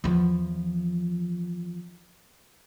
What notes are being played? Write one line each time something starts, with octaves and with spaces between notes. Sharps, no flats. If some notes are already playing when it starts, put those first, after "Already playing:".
E2 F3